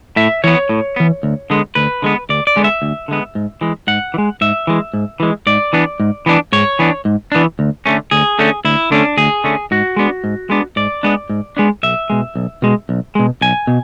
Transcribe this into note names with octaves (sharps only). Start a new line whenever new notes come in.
A2 E5
E3 B3 C#5
A2
E3 B3
D2
D3 G#3 B3
D2 B4
D3 G#3 B3
D2 D5
D5
D3 G#3 B3
E5
D2
D3 G#3 B3
G#2
E3 G#3
G#2 F#5
E3
G#3
G#2 E5
E3 G#3
G#2
E3 G#3
G#2 D5
E3 B3 D4
G#2
E3 B3 D4
G#2 C#5
E3 B3 D4
G#2
E3 B3 D4
D2
D3 A3 C#4
D2 G#4
D3 A3 C#4
D2 E4
D3 A3 C#4 D4
D2 G#4
D3 A3 C#4
G#2 F#4
G#3 B3 D4
G#2
G#3 B3 D4
G#2 D5
G#3 B3 D4
G#2
G#3 B3 D4
B1 E5
B2 G#3
B1
B2 G#3
B1
B2 G#3
B1 G#5
B2